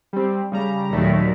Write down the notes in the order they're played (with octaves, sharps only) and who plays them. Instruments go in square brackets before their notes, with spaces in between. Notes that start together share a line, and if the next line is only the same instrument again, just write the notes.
[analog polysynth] G3 C4
C#3 G3 A#5
[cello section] D#2 A#2 F#3 [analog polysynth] D#3 A3